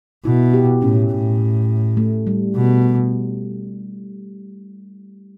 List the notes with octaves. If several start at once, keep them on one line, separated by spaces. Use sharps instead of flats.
B2 E4
G4
A2 C#4
A2
A3
G3
B2